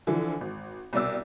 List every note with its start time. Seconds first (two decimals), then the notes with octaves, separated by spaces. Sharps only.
0.07 D3 E3 F3
0.41 G#1
0.93 C2 B2 D5 E6